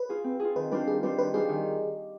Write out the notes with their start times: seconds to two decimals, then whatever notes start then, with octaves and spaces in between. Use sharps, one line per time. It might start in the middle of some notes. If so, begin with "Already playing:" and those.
Already playing: B4
0.09 F4 G#4
0.24 C4
0.40 F4 G#4
0.56 D#3 B4
0.71 G3 D4 F4 B4 C5
0.87 D#3 G#4
1.03 G3 D4 F4 B4 C5
1.18 D#3 B4
1.34 G3 D4 F4 G#4 C5
1.49 D#3